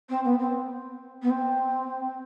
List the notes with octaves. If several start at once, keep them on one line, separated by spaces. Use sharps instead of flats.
C4
B3
C4
B3
C4